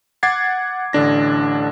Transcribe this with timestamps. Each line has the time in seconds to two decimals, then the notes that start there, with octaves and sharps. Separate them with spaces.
0.23 F#5 D6 G#6 A6 C7
0.93 A1 D3 D4 A#6